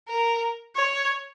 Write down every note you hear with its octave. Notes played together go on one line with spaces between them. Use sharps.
A#4
C#5